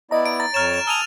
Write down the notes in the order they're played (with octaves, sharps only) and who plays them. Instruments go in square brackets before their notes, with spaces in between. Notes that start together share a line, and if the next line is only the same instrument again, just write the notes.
[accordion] B3 E4 D5 [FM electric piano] D#5 A#5
[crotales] D7
[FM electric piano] A#5 [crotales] A6
[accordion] F2 C#5 [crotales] F6 A6 E7
[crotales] E7
[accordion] G#5 A5 D#6 [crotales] E6 D#7 F7